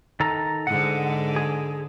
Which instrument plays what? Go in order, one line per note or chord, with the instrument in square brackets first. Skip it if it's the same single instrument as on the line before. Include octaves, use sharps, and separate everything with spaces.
[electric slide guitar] D#3 A4 A#5
[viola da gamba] G#2 D3 [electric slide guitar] F#5
[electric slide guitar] G#4